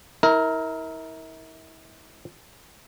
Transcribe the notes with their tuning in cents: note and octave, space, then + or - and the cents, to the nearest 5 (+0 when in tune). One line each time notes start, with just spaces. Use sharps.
E4 -40 A#4 +0